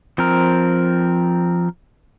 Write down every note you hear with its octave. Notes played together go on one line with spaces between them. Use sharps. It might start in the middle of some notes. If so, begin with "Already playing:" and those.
F3 C4 A#4